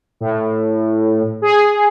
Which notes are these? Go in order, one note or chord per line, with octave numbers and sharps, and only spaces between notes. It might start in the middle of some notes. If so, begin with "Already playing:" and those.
A2
G#4